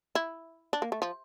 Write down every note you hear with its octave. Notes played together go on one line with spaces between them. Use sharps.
E4
D4
A#3
A3
F3